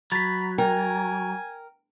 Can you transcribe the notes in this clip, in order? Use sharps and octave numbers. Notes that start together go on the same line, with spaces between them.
F#3 B5 A6 B6
A#4 G5 G#5